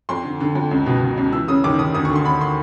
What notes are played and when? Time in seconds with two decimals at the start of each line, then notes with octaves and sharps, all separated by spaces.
0.09 F2 C6
0.24 D3
0.41 D3
0.55 F2
0.71 C#2
0.86 B2
1.02 B2
1.17 C#2
1.32 E3 E6
1.48 C#3 D#6
1.64 D#2 D6
1.79 D#2 D#6
1.95 D2 D#6
2.05 C#6
2.10 D3
2.15 C6
2.25 D3 B5
2.41 C6